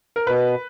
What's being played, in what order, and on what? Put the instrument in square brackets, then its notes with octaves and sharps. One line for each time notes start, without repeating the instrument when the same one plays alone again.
[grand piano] A#4
[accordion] B2 [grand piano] B4